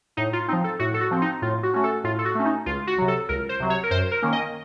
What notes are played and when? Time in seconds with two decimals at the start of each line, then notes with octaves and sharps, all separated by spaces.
0.17 A2 D#4
0.33 F4
0.48 C4 D#4
0.52 F3
0.64 A4
0.79 A2 F#4
0.94 A4
1.01 F#4
1.11 F3 C4
1.22 D#4
1.42 A2 F4
1.63 F#4
1.73 A3 C#4 F#4
1.84 A4
2.04 A2 F4
2.19 A4
2.25 F#4
2.35 A3 C#4
2.45 D#4
2.66 C#2 F4
2.87 F#4
2.98 C3 F#3
3.08 A4
3.29 C#2 A#4
3.49 C5
3.60 C3 F#3
3.70 C#5
3.83 A#4
3.91 F#2 C5
4.11 A#4
4.22 D#3 A#3 C#4
4.32 D#5